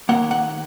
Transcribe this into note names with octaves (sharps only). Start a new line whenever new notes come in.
D#2 D#3 A#3 F#5
F#5